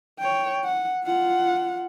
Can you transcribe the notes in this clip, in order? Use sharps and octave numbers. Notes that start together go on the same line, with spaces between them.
C#5 G5
F#5
F4 F#5